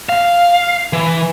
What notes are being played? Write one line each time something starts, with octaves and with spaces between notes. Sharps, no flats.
F5
E3